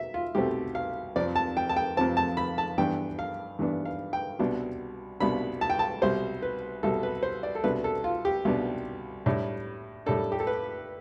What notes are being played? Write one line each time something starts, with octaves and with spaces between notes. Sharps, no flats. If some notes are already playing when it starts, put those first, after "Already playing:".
Already playing: B2 E5
F4
C2 B2 A3 C4 G4
F5
F2 C3 F3 C4 D5
A5
G5
A5
G5
F2 C3 F3 C4 A5
A5
B5
A5
G2 E3 B3 D4 G5
F5
G2 E3 B3 D4
F5
G5
C2 B2 B3 D4
C2 B2 B3 D4 B5
A5
G5
A5
C2 B2 G3 C5
B4
C2 B2 G3 A4
B4
C5
D5
A4
C2 B2 B3 D4 B4
A4
F4
G4
C2 B2 B3 D4
A2 G3 D4
A2 G3 D4 A4
G4
A4
B4